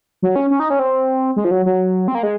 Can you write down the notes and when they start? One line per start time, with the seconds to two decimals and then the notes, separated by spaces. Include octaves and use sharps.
0.22 F#3
0.36 C#4
0.51 C#4
0.60 D#4
0.70 C#4
0.79 C4
1.36 G#3
1.45 F3
1.51 F#3
1.66 F#3
2.08 C4
2.15 A#3
2.23 G#3